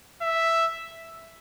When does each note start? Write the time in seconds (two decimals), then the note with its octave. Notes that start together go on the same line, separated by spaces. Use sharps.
0.22 E5